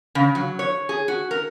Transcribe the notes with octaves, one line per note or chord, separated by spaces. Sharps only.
C#3
F#3
C#5
G#4
F#4
A#4